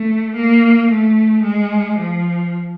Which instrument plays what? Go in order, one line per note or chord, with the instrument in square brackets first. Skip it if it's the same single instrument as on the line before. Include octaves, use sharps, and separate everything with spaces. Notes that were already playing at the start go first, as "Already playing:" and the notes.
Already playing: [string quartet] A3
A#3
A3
G#3
F3